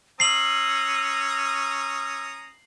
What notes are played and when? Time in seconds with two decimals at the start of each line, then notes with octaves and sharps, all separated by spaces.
0.20 C#4 A#5 D#6 E6 C7 F#7